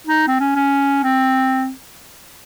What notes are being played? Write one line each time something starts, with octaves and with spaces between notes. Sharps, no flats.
D#4
C4
C#4
C#4
C4